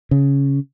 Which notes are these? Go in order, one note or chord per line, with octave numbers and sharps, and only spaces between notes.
C#3